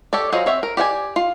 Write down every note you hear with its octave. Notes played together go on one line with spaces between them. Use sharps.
G4 A4 C#5 D5
F#3 F4 G#4 C5 D#5
C4 C#5 E5 F#5
A#4
G4 D5 F#5 G#5
F4